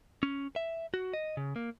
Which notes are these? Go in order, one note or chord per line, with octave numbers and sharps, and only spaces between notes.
C#4
E5
F#4
D#5
C#3
A#3